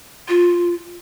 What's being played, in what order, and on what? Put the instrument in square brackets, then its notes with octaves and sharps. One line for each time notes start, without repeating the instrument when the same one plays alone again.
[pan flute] F4